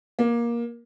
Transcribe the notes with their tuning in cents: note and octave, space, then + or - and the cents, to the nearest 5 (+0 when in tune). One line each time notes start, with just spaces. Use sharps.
A#3 +15